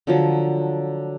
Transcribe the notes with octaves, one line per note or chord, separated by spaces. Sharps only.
D3 F3 F#3